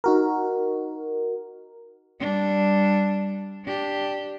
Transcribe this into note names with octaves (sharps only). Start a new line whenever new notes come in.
D#4 F#4 A#4
G3 D4
D4 G4